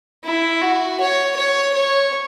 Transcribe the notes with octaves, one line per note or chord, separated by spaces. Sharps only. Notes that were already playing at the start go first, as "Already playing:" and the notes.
E4
F#4
C#5
C#5
C#5